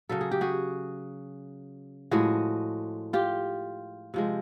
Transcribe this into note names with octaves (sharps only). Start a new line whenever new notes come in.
C#3 F#3 A4
G#4
G4
F#4 G#4
A2 F3 G#3 F#4 G#4
F4 G4
C3 F3 G#3